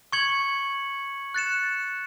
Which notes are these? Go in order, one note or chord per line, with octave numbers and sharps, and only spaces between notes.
C#6 G#6 C#7 F#7
F#6 A6 C#7 E7